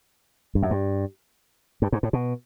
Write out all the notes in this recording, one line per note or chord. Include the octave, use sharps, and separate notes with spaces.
G2
F#2
G2
G2
G#2
A2
B2